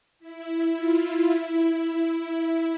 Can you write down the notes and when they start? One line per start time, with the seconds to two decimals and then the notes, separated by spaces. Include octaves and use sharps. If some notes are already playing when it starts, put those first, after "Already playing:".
0.20 E4
0.75 F4
1.30 E4